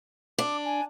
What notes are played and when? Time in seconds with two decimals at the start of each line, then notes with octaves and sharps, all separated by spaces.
0.38 D4 D6
0.65 G#5